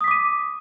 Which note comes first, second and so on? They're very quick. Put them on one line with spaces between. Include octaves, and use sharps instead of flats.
D#6 B6 D6 D#7